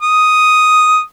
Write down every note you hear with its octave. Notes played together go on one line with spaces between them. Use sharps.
D#6